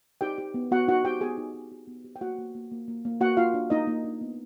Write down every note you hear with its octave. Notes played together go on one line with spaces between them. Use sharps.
D#4 G4 G5
G4
B3
B3 F#4 F#5
D#4 F#4 F#5
G4 G5
B3 G#4 G#5
D#4
D#4
G4
B3
G4
G5
A#3 F#4 F#5
A#3
A#3
A#3
A#3
A#3
A#3 F#4 F#5
A#3 F4 F5
D4
A#3 D#4 D#5
A#3
D4
B3